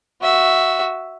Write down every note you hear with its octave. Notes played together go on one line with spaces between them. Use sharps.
F#4 E5